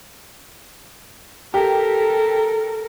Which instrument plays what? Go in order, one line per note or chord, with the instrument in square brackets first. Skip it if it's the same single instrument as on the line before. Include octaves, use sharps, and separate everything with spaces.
[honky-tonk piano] G4 [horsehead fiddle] A4 A#4